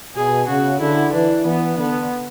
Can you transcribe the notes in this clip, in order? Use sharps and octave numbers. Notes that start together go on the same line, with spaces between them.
B2 G#4
C#3 F#4
D3 E4
E3 D4
E3 B3
D3 B3